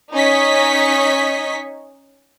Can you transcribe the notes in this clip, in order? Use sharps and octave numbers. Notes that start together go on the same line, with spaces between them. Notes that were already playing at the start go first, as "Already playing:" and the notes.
C#4 D#4 D#5 C#6 B6